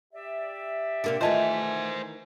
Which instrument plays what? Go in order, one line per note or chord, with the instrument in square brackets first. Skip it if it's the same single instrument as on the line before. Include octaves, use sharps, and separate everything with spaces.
[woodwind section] G4 D5 E5
[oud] C3 A#3 D4
[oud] D#3 E3 A3 [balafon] F4 D#5 A5 [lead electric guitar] C5 G#5